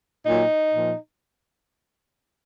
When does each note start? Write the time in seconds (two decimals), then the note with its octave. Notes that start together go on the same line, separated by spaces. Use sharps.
0.25 A#2 F#3 D#4
0.74 A#2 F3